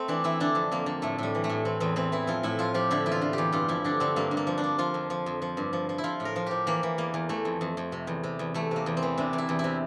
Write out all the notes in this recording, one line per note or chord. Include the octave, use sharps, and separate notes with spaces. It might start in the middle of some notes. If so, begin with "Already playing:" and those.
Already playing: A3 C4
E3 D4
E3 E4
D3 D4
F2
F2 A#3
D3
A2 A3
A2 G3
E3
A3
A2
E3 C4
E2 C4
E3 C4
E3 E4
F3 F4
A2 E4
F3 F4
F3 G4
D3 E4
E2 E4
F4
D3
E2 G4
G2 F4
F3 E4
D3 D4
D3 C4
G2 A#3
G2
A#3
F3
D4
F3
F3 F4
F2
F3
F2
F3
G2
F3
F3
E4
F3 F4
A2
A#4
F3
F3 G4
E3 A#3
E3
E2 A#3
E2
E3 A3
F2
F2
F2
C3
E2
C3
E2
E2 A3
C3 A#3
E2
C4
E3
C3 D4
E2
E4
E2
E4
C3